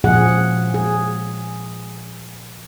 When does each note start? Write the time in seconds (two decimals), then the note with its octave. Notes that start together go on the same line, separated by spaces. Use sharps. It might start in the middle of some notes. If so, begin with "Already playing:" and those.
0.04 A#2 C#3 F3 G#4 F#5
0.74 G#4